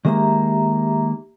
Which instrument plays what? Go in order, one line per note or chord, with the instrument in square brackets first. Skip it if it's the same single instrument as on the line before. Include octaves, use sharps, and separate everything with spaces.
[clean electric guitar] D#3 G#3 A#3 [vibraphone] G4 E5 A#5